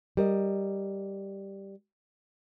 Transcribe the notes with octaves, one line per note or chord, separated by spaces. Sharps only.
G3 A#4 D#5